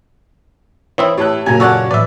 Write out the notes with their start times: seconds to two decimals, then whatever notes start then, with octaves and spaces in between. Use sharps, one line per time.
0.98 E3 C4 E4 C#5 E5 D#6
1.17 A2 G4 C#5 A5 F#6
1.46 F#1 A#2 F#3 G#5 A#5
1.60 C#4 F#4 A4 C#5 D5 F#5
1.91 A2 E3 F#3 B4 D5 E5